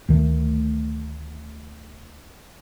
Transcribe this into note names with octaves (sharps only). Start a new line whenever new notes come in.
D2 D#3 A3